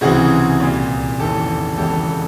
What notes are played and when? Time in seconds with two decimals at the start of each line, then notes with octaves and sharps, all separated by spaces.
0.01 C#2 C3 E3 F#4 G#4
0.60 C2 A#2
1.19 F1 D#2 C#3 E3 G4 A4
1.77 E1 E2 C#3 E3 G4 A4